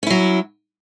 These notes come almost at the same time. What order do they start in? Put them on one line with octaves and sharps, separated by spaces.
C#4 E4 F#3